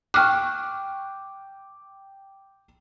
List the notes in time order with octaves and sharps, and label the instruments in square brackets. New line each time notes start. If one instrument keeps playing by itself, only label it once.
[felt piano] G5 D6 [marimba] C#6 F6 F#6